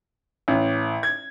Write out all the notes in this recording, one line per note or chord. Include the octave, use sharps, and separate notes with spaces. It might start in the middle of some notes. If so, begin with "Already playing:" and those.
A1
G#6